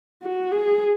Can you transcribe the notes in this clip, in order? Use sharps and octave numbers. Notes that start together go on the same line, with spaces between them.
F#4
G#4